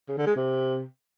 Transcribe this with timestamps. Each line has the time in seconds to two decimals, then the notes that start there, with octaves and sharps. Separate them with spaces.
0.08 C#3
0.18 D3
0.27 G#3
0.36 C3